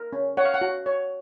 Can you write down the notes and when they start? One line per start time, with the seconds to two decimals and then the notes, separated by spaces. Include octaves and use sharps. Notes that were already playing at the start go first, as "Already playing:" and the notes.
Already playing: A#4
0.13 C#4
0.37 C#5 F#5
0.45 F5
0.54 F#5
0.61 F#4
0.86 C#5